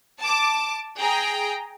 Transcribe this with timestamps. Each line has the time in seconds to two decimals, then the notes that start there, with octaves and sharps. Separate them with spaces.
0.23 A5 D6
1.00 G#4 G5 A#5